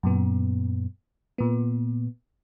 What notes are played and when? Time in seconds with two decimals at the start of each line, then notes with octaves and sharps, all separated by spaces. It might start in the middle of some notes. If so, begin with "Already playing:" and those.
0.03 F#2 A#2 B3
1.38 A#2 B3